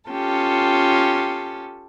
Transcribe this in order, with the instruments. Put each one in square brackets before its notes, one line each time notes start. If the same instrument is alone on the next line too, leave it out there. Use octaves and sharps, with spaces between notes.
[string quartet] C#4 F4 G4 A4